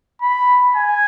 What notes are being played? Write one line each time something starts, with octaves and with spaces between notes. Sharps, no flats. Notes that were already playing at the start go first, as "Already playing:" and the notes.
B5
G#5